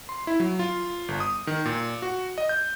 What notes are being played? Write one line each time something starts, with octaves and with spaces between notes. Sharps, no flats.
C6
E4
F#3
F4
G1
D#6
D#3
A#2
F#4
D#5
G6